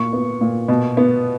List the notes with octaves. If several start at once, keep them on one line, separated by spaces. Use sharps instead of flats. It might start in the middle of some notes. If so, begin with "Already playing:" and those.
Already playing: A#2 C#6
B3
A#2
B2
B3